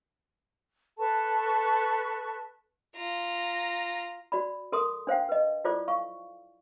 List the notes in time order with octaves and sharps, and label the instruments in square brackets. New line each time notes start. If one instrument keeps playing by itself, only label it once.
[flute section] A4 B4 A5 C#6
[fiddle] F4 A#5
[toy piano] F#4 D5 B5
A4 A#4 C6 D#6
D4 C5 F5 G5
B4 D#5
E4 F4 A4 C5 D5 D6
F5 C#6